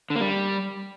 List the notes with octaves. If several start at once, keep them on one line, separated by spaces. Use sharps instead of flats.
D3
A#3
G3